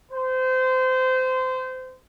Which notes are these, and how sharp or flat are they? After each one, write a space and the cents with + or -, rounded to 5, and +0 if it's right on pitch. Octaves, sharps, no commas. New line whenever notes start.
C5 -25